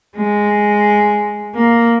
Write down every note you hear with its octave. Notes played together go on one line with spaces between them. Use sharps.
G#3
A#3